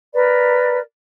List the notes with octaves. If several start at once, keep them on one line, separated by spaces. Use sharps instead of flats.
A#4 B4 D5